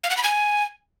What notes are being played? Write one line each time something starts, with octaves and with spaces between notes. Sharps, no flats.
F5
F#5
B5
G#5